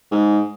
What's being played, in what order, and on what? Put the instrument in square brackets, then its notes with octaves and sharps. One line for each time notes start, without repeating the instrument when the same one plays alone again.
[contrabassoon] G#2